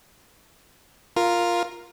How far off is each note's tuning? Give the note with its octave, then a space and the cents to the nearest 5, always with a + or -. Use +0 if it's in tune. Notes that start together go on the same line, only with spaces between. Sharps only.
F4 +0 A#4 +0